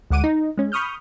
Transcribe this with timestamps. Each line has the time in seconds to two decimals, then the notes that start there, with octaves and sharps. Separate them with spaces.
0.10 D2 G#3 F#5 D6 D#7
0.24 D#4
0.58 G#3 C#4
0.72 B5 C#6 D#6 F6 G6